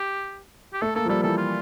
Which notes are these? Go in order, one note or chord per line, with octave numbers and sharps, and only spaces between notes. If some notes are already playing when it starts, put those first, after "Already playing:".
Already playing: G4
G4
A3 A4
A#3 A4
F3
G3 A4
E3 A4
F4